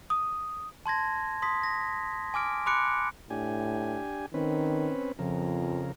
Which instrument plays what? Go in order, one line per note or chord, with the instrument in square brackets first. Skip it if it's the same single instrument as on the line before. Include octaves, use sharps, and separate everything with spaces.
[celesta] D#6
[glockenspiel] A5 C6 G#6 A#6
C6 D#6 B6
A#6
G#5 D6 F6 D7
B5 C6 D6 F#6 C#7 D7
[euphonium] A2 [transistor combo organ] D4 G4 G#5
[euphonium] D#3 [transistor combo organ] C4 C#4 B4
[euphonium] F2 [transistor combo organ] C#3 F3 A#4